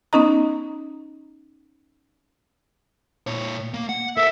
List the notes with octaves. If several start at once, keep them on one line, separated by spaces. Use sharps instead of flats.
B3 C#4 D#4 D#5 A#5
A#2 C#5
A#3
F#5
A4 A#4 E5